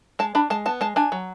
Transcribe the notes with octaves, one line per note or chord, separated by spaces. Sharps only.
G#3 A5
D4 B5
G#3 A5
B3 A5
G#3 A5
D4 G#5
F#3